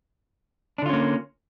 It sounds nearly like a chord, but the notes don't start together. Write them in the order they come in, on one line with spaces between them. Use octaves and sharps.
D4 D3 F4 C#4 A#3